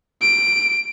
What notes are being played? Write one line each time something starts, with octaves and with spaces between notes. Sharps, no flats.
D7